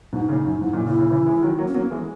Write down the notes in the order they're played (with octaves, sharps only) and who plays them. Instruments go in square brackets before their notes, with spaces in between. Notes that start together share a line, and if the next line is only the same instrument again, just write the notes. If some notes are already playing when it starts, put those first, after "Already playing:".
[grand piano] G#2 B2 [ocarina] D#4
[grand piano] A#2 C#3
F#2
[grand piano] G#2 [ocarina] E4
[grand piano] F#2 A#2
[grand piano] A#2 C#3 [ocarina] E4
[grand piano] A#2 C#3
C#3 E3
E3 G#3
D#3 F#3
F#3 A#3
[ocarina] C#4
[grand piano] F#3 A#3 [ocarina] B3
[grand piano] E3 G#3